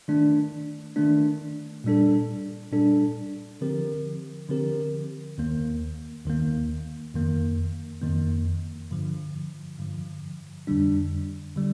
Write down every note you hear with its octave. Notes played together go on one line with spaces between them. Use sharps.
D#3 A3 D4
D#3 A3 D4
A#2 G3 D4 A4
A#2 G3 D4 A4
D3 F3 C4 G4 A#4
D3 F3 C4 G4 A#4
D#2 D#3 A#3
D#2 D#3 A#3
F2 D#3 A#3
F2 D#3 A#3
G2 D3 F3
G2 D3 F3
F2 D3 G3 D4
D3 G3